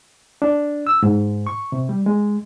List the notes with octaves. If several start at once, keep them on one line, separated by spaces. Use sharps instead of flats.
D4
E6
G#2
C#6
C3
G3
G#3